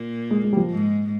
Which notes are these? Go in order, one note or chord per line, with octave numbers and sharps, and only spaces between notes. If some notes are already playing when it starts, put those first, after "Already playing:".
Already playing: A#2 A#3
G#3
G#3
G3
F3
G#2 G#3